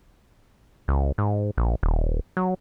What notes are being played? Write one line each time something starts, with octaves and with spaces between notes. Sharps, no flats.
C#2
G#2
A#1
D#1
F#3